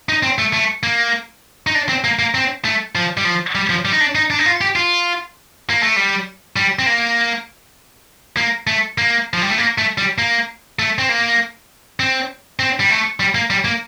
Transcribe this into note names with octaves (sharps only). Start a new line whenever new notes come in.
D#4
C4
A3
A3
A#3
D#4
D4
C4
A#3
A#3
C4
A3
F3
G3
F3
G3
F3
G3
D#4
D4
D#4
D4
D#4
F4
G4
F4
A#3
A3
G3
G3
C4
A#3
A#3
A3
A#3
F3
G3
A3
A#3
A3
G3
A#3
A3
C4
A#3
C4
C4
G3
A3
G3
A#3
G3
A#3